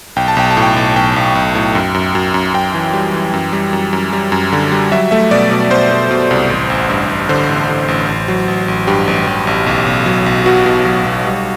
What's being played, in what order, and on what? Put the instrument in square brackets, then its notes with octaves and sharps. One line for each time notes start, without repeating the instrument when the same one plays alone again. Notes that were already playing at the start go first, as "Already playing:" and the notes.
[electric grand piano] B1 G5
A5
B1 G5
A5
A2
G5
B1
B1 G5
B1
B1
A2
F#2
F#2
F#2
F#2
F#2 G5
E3
G3
E3
F#2
G3
F#2
F#2
G3
F#2
D3
G3
F#3 E5
A3 E5
B2 D5
B2
B2 C5
B2
B2
C2
A1
A1
G2
A1
D3 C5
A1
D3
A1
A1
F#3
A1
A1
G2 G4
A1
A1
A1
B1
B1
F#3
B1
B2 F#4
B2
F#3
B1
G3